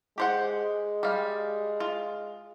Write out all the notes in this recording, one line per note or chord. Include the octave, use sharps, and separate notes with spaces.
G#3 G4 C5 F#5
G3 F5
F4